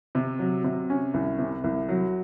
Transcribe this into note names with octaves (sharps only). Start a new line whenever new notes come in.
C3
F#3
C3
C#4
C2
C3
C2
F#3